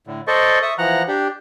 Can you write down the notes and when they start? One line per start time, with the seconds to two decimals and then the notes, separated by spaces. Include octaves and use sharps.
0.07 A2 D3
0.27 A4 C5 D5 D#5 C#6
0.62 E5 C#6 D#6
0.78 E3 F3 F#5 A#5 F#6
1.08 D4 G4